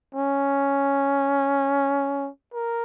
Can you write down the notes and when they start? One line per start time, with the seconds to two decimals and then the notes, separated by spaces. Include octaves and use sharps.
0.15 C#4
2.54 A#4